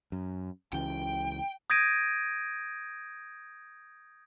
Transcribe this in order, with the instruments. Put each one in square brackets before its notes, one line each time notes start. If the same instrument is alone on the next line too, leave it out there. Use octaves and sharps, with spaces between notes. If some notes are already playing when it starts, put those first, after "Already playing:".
[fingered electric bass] F#2
[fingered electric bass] C#2 C#3 E3 [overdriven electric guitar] G5
[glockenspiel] D#6 G6 G#6 A#6 D7 D#7